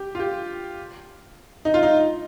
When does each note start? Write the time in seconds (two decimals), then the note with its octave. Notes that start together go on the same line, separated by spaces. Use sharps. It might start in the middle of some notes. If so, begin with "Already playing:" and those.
Already playing: G4
0.15 F4
0.20 G4
1.65 D#4
1.74 F4
1.83 D#4